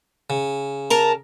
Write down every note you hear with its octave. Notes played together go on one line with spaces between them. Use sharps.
C#3
A#4 A5 A#5